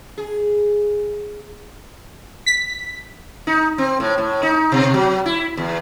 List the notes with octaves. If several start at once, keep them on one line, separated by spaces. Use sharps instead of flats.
G#4
B6
D#4
C4
A2
A2
D#4
B2
F#3
E4
E2